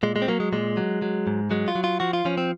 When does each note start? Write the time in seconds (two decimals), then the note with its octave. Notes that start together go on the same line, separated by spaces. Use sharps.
0.03 A#2 G#3
0.16 G#3
0.22 C4
0.28 F#3 A#3
0.40 G#3
0.52 A#2 G#3
0.77 F#3
1.02 F#3
1.27 G#2
1.51 F#3 G#3
1.68 F4
1.75 F#3
1.84 F4
2.00 F3 F#4
2.13 F4
2.25 F3 C#4
2.38 C4